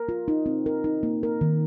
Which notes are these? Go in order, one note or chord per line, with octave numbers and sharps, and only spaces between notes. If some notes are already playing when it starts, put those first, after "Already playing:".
Already playing: A#4
F4
D#4
C4
A#4
D#4
A#3
A#4
D#3